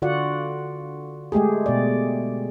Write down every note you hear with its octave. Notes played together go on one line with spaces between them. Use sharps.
D3 F4 F#4 D5 F#5
G#3 A3 G4 G#4
B2 D5